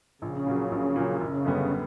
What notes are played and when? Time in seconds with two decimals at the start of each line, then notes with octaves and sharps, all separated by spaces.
0.21 A#1 C#3
0.47 A#2 F#3
0.71 A#1
0.96 A#2 F#3
1.20 F#1 C#3
1.45 F#2 D3 G3 B3